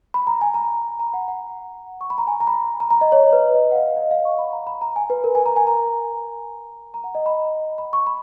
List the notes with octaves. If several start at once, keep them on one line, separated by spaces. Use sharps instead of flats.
B5
A#5
G#5
A#5
A#5
F#5
F#5
C#6
B5
A#5
G#5
A#5
B5
A#5
A#5
D#5
C#5
C#5
B4
D#5
D#5
F#5
F5
F5
D#5
F5
C#6
B5
A#5
B5
A#5
G#5
B4
A#4
G#5
A#5
G#5
A#5
A#5
F#5
D#5
B5
B5
C#6
B5